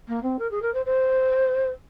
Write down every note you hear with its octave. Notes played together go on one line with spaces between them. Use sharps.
A#3
C4
A#4
G#4
A#4
C5
C5